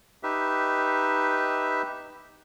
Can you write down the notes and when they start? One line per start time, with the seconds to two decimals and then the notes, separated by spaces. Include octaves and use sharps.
0.23 D#4 G4 B4 E5